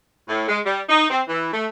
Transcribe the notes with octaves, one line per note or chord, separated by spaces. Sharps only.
A2
G#3
G3
D#4
C4
E3
A3